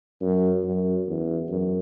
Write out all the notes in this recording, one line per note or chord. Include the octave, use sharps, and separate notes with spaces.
F#2
F#2
E2
F#2